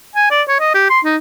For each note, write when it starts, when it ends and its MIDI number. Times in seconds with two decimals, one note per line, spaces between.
0.15 0.27 80
0.31 0.42 74
0.48 0.56 73
0.60 0.71 75
0.74 0.85 67
0.90 1.00 84
1.05 1.17 63